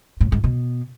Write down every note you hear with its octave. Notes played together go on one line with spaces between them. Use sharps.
A2
G#2
B2